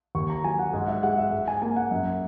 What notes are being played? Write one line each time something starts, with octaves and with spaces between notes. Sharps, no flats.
D#2 C#6
A#5
F#3 G#5
F#5
G#2 F#5
E5
G#3 F#5
E5
G#2
G#5
A#3 G#5
F#5
F#2